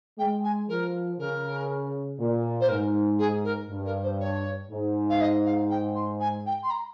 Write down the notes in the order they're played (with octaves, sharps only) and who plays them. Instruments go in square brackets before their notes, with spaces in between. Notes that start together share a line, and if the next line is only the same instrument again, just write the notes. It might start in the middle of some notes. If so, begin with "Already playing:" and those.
[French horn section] G#3 [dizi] G5
[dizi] G#5
[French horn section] F3 [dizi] A#4
[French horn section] C#3 [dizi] A#4
[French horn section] A#2
[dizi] C5
[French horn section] G#2 [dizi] A#4
[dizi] G#4
A#4
[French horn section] G2
[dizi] A#4
C5
C#5
[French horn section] G#2
[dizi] F5
D#5
F5
G5
C6
G#5
G5
C6
A#5